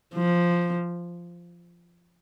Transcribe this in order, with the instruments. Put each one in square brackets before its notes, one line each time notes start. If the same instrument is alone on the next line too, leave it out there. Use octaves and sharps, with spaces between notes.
[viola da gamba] F3